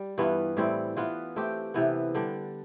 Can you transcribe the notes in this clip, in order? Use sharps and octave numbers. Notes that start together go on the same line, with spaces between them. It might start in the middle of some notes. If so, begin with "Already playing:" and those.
Already playing: G3
G2 E3 B3 F4
A2 G3 C4 E4
E3 B3 F4
A3 C4 G4
C3 E3 B3
D3 G3 D4